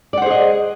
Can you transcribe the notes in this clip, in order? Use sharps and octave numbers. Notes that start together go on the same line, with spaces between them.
G#4 C5 D5 D#5 F#5